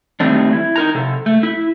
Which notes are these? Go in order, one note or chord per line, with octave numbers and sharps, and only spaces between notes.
D#3 G3 A3 C4 D4
E4
D#4 A#4 A#5
C3 A4
A3
E4